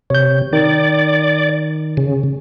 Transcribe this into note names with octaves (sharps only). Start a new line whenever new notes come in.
C3 C#5 G6
D#3 D5
C#3